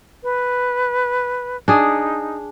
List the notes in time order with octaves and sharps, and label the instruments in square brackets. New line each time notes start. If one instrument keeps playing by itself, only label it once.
[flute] B4
[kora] D4 G#4 [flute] D#4